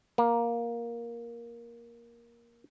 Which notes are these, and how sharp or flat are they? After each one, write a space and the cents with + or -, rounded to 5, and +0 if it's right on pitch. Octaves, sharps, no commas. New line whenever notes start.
A#3 +10